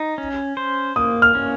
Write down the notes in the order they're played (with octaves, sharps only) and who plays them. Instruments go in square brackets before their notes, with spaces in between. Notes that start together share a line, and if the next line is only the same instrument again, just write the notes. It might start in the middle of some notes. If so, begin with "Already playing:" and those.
Already playing: [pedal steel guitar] D#4
C#4
C5
[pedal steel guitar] A#3 [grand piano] D#6
[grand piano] F6
[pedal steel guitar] C#4